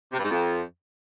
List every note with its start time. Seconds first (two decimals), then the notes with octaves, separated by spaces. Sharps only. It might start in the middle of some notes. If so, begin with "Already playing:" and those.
0.13 C3
0.19 G2
0.25 G#2
0.31 F2